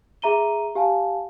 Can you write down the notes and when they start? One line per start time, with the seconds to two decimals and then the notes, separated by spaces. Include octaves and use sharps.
0.22 G#4 E5 A#5 D#7 G7
0.75 G4 F5 G#5 A5